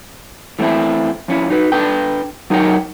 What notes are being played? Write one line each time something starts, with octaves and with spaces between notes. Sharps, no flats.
E3 A3 B3 C4 E4
F2 C#4 E4
D#4 F#4 B4
D4 A4 B4 G5
F#3 D#4 G#4 A#4 C#5 G5